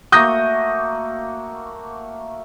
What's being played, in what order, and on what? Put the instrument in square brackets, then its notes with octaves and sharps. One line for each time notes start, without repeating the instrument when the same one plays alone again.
[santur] A3 A#3 F#4 [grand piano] D#6 G6 A#6